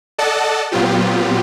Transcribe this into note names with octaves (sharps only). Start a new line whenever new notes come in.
A4 D5 D#5 F#5 A5
A#2 F#3 B3 C4 F4 G4